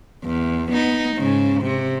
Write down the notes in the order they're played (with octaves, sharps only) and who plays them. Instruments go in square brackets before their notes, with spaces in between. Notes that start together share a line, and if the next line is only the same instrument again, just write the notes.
[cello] E2
B3 D#4
G#2 C#3
C3